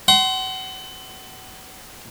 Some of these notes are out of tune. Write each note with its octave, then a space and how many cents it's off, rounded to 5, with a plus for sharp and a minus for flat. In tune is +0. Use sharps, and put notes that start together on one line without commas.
F#5 +35 C6 +0